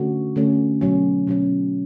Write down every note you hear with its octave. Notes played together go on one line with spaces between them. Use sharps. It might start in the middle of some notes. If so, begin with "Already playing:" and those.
Already playing: D3 A3 C#4 F#4
D3 A3 C#4 F#4
B2 F#3 C#4
B2 F#3 C#4